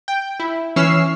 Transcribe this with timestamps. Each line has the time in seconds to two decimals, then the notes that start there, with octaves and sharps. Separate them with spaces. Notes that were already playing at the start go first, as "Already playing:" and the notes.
0.08 G5
0.40 E4
0.76 E3 C#4 C#6 E6 F6 C7